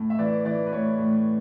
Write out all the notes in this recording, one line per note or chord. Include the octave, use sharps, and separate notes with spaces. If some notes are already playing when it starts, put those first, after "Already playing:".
Already playing: A2
E5
E3 D5
E3 D5
B4
A2 C#5
A2